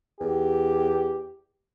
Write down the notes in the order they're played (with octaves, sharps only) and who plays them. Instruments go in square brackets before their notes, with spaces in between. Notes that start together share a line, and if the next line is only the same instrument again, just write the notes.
[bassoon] E2 [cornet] G4